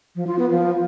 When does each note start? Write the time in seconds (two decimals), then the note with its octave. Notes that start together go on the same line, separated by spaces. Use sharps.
0.16 F3
0.27 F4
0.39 B3
0.51 F3